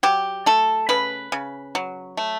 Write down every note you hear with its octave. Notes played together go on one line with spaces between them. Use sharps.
F#3 G4
A3 A4
C#3 B4
C#3
F#3
A3